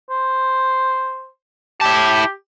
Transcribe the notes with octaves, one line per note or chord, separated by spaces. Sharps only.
C5
E4 G4 A5